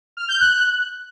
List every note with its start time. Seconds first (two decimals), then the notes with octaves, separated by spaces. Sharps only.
0.17 F6
0.29 G6
0.40 F#6